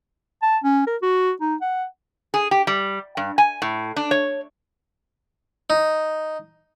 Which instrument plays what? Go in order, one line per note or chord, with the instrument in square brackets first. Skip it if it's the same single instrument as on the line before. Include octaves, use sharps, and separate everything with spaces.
[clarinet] A5
C#4
A#4
F#4
D#4
F#5
[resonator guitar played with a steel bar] G#4
G4
G3
G2
G#5
A2
D4
C#5
[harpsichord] D#4